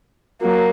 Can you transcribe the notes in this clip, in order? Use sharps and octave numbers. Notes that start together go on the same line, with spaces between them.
F#3 A#3